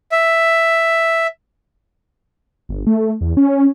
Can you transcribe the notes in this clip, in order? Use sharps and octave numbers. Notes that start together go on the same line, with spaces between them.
E5
G1
A3
E2
C#4